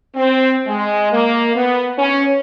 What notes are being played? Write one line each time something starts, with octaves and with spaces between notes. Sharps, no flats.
C4
G#3
A#3
B3
C#4